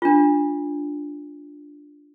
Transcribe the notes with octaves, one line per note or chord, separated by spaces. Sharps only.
D4 F4